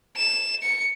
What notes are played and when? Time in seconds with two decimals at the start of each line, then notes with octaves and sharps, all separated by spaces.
0.16 E7
0.63 C#7